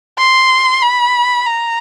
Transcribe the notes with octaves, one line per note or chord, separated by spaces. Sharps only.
C6
B5
A#5